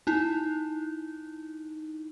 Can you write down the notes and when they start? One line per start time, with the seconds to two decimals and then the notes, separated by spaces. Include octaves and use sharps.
0.07 D#4 E4